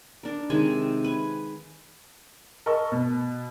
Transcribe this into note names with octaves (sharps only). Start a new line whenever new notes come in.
D4 A#4
C3 D#3 G#3 G#5
B4 G#5
A#4 D#5 A5 C#6 E6
B2